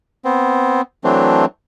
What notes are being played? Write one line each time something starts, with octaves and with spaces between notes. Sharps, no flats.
B3 C4
E3 F#3 A3 C4 D4